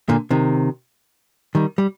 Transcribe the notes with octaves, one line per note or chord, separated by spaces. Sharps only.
A#2 D3
C3 D#3
D#3 G3
G3